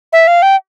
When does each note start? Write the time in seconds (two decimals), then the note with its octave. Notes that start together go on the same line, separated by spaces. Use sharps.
0.13 E5
0.27 F5
0.42 G5